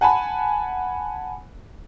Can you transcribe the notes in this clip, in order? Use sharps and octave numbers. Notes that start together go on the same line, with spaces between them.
F#5 G#5 A5 B5